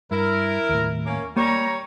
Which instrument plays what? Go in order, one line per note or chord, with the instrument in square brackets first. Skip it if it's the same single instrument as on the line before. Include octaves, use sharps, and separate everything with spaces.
[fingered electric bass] G2 [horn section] E4 A#4
[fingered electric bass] D#2 A2
[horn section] A#3 C#4
[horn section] G3 C#5 A#5 [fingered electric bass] A#3